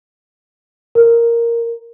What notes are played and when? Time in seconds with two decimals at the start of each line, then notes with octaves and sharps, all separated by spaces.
0.95 A#4